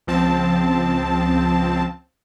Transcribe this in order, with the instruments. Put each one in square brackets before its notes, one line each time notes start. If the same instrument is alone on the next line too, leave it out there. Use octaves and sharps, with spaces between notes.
[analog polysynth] C#2 F3 C4 A5